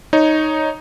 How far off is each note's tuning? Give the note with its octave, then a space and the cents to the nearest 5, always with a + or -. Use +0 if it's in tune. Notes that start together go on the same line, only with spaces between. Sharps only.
D#4 +0 C#5 +0